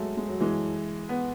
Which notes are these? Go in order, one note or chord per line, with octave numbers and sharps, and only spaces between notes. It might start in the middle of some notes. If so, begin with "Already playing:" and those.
Already playing: F#3 G#3 A3
G#3
F#3
E3 G#3
B3